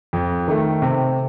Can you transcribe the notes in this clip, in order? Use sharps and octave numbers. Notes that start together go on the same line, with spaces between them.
F2
D#3 A3
C3